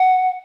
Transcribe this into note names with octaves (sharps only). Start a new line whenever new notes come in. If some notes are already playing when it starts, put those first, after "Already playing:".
Already playing: F#5